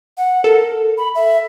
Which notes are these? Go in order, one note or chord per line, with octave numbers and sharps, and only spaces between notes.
F#5
A4 A#4
B5
E5